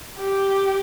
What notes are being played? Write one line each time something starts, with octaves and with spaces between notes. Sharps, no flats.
G4